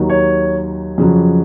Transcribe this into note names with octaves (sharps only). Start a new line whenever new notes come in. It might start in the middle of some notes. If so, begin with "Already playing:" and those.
Already playing: D#2 D#3 F#3
C#5
F2 C#3 F#3